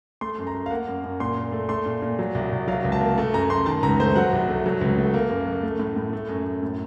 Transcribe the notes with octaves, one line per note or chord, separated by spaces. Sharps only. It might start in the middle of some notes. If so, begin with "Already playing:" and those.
A3 C6
F#2
A#5
F#2
F5
A#3 F#5
F#2
F#2
A#2 C6
A#2
A3
A3 C6
A#2
A#2
F#3
C2
C2
F#3 F5
C#2
A5
A#3
A3 A5
F#2 A#5
F#2 C6
D#3 A5
C#2 A#5
A3 C5
F#3 F#5
C2
A3
F#3
C#2
A3
A#3
F#2
F#2
A3
A2
A2
A3
F#2
F#2
A2